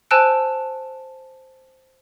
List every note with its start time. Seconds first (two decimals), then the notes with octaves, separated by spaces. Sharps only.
0.11 C5 G#5 A5 E6 F#6 D7